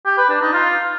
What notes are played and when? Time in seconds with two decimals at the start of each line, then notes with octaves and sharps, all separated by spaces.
0.06 G4
0.17 B4
0.29 D4
0.41 D#4
0.53 F4